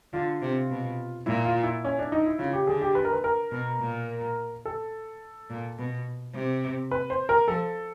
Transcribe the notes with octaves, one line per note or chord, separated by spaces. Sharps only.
D3 F4
C3
B2
A#2 E4
F4
E4
C#4
D4
D#4
E4
C#3 F4
G4
D3 G#4
G4
B4
A#4
B4
A#4
B2
A#2
A4
A#2
B2
C3
B4
C5
A#4
F3 A4